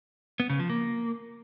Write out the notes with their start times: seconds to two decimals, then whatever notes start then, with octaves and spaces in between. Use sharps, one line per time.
0.40 B3
0.50 C#3
0.60 F3
0.70 A#3